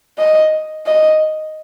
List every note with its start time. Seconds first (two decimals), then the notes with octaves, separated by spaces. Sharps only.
0.19 D#5
0.86 D#5